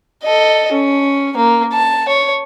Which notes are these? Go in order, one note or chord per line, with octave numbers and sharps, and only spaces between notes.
A4 D#5
C#4
A#3
A5
C#5